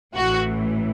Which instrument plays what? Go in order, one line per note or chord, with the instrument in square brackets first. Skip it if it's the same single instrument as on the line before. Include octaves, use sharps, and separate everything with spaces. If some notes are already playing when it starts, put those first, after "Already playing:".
[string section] A1 A2 E3 F#4